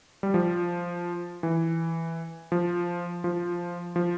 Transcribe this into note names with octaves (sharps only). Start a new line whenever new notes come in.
G3
F3
E3
F3
F3
F3